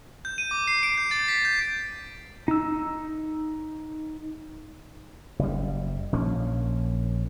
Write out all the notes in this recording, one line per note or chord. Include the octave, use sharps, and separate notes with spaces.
G6
D#7
D6
C7
D7
G6
A6
B6
G6
D#4 E6
F#1 G3
A#1 F3 A#3 C#4